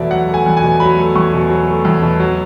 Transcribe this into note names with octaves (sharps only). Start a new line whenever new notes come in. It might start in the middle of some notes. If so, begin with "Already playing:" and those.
Already playing: E2 B2 F#3 A3 D5 E5
F#3 F#5
A3
G#5
E2
G#5
B2
F#3 B5
A3
E2 C#6
B2
F#3
A3
E2
B2
F#3